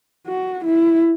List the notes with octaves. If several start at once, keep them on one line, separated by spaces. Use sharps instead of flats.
F#4
E4